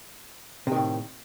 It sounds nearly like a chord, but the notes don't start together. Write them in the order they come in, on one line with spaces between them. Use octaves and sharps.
C3 D#3 A2